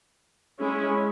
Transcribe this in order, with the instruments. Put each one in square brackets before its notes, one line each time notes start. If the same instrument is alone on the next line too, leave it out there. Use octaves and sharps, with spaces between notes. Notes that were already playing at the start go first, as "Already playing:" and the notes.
[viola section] G#3 C#4 E4